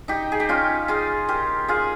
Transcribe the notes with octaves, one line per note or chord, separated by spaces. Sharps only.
D#4 G4
G#4
G4
C#4 F4
F4 G#4
G4 A#4
F4 G#4